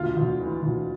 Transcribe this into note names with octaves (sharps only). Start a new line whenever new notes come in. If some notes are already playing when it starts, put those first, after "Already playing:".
Already playing: D2 F4
D2
E3
D2